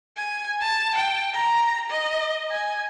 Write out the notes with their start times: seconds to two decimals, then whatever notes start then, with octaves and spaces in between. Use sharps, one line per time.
0.17 G#5
0.60 A5
0.95 G5
1.33 A#5
1.90 D#5
2.50 G#5